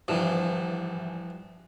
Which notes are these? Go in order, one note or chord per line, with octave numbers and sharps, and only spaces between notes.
G#1 G2 E3 F3